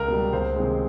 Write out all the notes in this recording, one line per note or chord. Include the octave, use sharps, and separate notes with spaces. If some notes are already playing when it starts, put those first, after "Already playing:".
Already playing: C#2 A#4
B2 G3
C#2 C5
C3 D#3 G#3